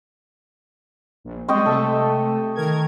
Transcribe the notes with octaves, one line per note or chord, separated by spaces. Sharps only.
A#1
G3 G#3 C4 D#5 G5 C#6
C3 A3 A4 A5
D#3 A#4 G#6